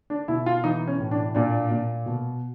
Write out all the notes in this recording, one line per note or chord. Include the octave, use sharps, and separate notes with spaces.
D4
B2 E4
F4
E3 D#4
C#4
A2
D4
A#2 D4
A#2
B2